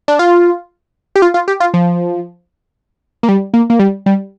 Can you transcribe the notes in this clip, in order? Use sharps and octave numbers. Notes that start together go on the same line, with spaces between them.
D4
F4
G4
F4
F4
G4
F4
F3
A#3
G3
A#3
A#3
G3
G3